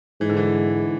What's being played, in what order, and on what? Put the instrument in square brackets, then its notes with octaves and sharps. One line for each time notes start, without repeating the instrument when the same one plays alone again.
[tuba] G#2 [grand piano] E3
[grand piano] D3
E3